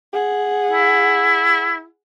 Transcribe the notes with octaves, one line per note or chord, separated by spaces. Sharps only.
G#4 F#5
E4